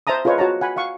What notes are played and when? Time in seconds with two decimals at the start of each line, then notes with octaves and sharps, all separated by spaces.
0.07 C5 E5 A5 A#5 D#6
0.25 F4 G#4 B4 C#5 D#5
0.38 F#4 C#5 A5 A#5
0.61 F#5 G#5 B5
0.76 F5 F#5 C#6